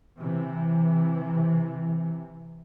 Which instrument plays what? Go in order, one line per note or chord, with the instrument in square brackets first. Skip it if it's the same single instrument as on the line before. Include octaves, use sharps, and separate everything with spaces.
[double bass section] C3 E3